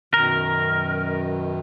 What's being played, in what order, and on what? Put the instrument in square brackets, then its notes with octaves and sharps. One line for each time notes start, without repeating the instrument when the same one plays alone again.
[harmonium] F#2 B2 D#3 [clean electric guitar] A#4